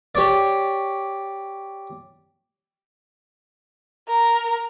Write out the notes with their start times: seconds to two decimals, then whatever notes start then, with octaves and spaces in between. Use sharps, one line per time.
0.15 G4 C#5 D5
4.08 A#4